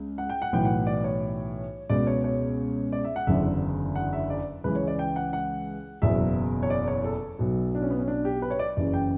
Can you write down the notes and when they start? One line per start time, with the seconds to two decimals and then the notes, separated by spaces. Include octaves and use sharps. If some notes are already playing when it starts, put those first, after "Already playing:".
Already playing: C#2
0.18 F#5
0.29 G5
0.42 F#5
0.52 B1 A2 E3 G5
0.65 F#5
0.87 D5
1.04 C#5
1.89 C#2 B2 D5
2.07 C#5
2.24 C#5
2.92 D5
3.04 E5
3.16 F#5
3.27 F#1 E2 D3 E5
3.95 F#5
4.13 E5
4.30 D5
4.64 C#2 C#3 E3 B4
4.76 C#5
4.88 D5
4.99 G5
5.16 F#5
5.33 F#5
6.02 F#1 E2 B2 E5
6.63 C#5
6.70 D5
6.88 C#5
7.04 A4
7.39 B1 B2
7.75 D4
7.82 C#4
7.90 B3
7.99 C#4
8.08 D4
8.25 G4
8.42 B4
8.50 C#5
8.59 D5
8.77 F#1 F#2 C#3 E3 D5
8.93 G5